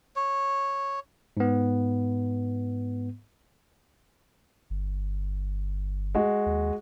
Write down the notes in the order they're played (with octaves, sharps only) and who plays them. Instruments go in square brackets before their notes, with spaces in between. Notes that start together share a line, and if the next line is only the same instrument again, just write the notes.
[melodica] C#5
[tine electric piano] G#2 B3
[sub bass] G1
[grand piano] G#3 F#4
[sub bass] D#2